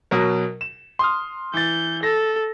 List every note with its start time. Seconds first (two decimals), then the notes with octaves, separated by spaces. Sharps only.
0.11 B2 F#3 A#4
0.61 E7
0.99 C6 D#6 F6
1.54 E3 G6 A6
2.03 A4 A#6